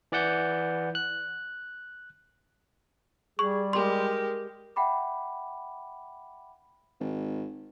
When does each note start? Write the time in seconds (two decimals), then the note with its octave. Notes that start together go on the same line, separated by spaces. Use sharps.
0.12 E3 D5 F#5 G6
0.95 F#6
3.39 G3 G#4 C#6
3.73 G#3 G4 A#4 C6
4.76 E5 F#5 G5 B5 D6
7.00 G#1